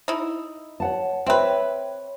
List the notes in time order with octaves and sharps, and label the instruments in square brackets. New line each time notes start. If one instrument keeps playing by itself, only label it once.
[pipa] D#4 E4
[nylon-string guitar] C#5 F#5 A5
[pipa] C4 B4 [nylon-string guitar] C#5 E5 G5